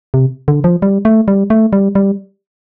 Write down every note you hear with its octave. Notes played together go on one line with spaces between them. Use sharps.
C3
D3
F3
G3
A3
G3
A3
G3
G3